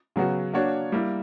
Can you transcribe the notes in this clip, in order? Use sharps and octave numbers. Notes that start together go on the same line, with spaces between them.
C#3 F#3 B3 F#4
A#3 D4 F#4 C#5
G3 A#3 E4